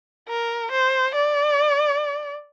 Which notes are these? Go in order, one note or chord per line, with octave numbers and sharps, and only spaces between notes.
A#4
C5
D5